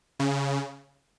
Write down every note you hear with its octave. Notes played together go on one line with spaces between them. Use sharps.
C#3